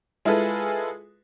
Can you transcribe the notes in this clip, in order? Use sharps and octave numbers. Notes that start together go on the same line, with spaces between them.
G#3 E4 F4 G#4 A4 B4